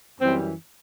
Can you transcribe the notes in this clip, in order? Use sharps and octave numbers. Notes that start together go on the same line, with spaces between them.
F#2 E3 G3 C4